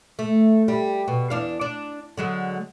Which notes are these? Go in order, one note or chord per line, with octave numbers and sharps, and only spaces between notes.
A3
G3
B2
E2 D4 F5
D4
D3 F#3 G#3